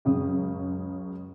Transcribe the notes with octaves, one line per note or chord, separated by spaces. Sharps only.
C#2 F#2 C#3 D#6